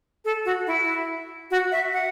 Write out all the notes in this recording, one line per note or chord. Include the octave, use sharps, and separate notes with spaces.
A4
F#4
E4
F#4
E5
F#5